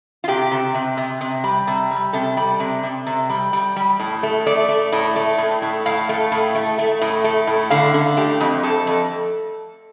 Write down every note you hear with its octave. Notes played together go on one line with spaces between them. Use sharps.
F4
C3 G4
C3
C3
C3
C3
G3
C3
G3
C3 A4
G3
C3
C3
C3
G3
G3
G3
A2
A3
A3 D5
A3
A2
A3
A2
A2
A2 F5
A3
A2
A3
A3
A2
A3
A2
D3 F5
D3
A3 G4
F2
F2 A4
F2